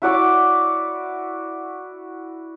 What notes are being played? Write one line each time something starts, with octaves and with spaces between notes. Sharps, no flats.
E4 F#4 D5 D6